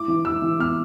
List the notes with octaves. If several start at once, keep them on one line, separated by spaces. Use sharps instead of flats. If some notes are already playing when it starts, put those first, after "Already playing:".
Already playing: E4 D6
E3
E3 E6
E3
B3 F6